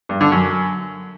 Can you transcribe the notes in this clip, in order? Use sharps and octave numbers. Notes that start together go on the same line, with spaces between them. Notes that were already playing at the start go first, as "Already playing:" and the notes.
G2
D3
F#2